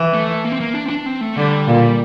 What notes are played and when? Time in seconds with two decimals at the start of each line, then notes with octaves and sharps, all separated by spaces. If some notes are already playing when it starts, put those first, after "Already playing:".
Already playing: E3
0.14 A3
0.45 A#3
0.52 C4
0.61 A#3
0.75 D4
0.86 C4
0.90 D4
1.06 C4
1.21 A3
1.36 D3 G3
1.67 A#2